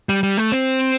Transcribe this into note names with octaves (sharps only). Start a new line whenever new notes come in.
G3
G3
A3
C4